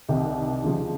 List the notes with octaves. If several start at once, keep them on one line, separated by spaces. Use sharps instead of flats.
C2 C3 D#3
D#2 C#3 F3